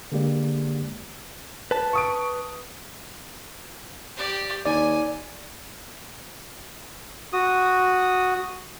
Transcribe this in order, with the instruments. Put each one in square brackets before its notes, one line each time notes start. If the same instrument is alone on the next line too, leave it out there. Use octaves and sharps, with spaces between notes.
[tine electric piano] D3 G#3 A#3 G4 D5
[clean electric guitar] B4 A5
[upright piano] C#6 D#6 D7
[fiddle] G4 D5
[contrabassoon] D#2 [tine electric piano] D5 [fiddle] G#5
[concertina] F#4 D#6